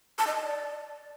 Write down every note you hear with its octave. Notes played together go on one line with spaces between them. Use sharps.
A5
D#5
A5
D5